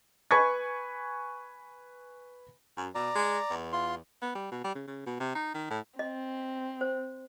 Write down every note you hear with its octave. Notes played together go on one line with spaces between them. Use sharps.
B4 G#5 B5 C#6 G#6
F#2
B2 D5 A#5
G#3
E2
F4 C6
B3
G3
B2
G3
C#3
C#3
B2
C3
D#4
D#3
A2
C4 D#5
C5